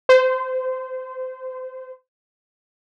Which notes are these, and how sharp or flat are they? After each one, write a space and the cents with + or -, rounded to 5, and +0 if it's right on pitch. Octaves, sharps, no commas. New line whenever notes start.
C5 -25